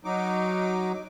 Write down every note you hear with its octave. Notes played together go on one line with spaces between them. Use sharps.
F#3 D#4 D6